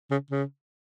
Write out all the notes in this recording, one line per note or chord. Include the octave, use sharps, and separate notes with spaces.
C#3
C#3